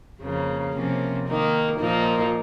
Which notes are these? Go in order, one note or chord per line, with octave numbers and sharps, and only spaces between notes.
F2 C#3 F3 A#3
C3 F3 A#3 C#4
D#3 A#3 D#4
A#2 F3 A#3 D#4